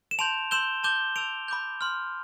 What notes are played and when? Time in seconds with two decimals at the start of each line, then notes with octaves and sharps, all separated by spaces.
0.11 E7
0.19 A5 C6 G6 D7 F7
0.51 C6 E6 G6 E7 G7
0.83 A5 D6 G6 E7 G7
1.16 A5 E6 G6 D7 F7
1.48 B5 D6 G6
1.81 C6 F6